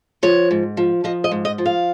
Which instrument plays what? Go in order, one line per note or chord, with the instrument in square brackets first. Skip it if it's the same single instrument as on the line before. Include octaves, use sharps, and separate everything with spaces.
[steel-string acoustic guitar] F3 C#5
G#2
F3
F3 D#5
D#5
G#2
D#5
F3
F5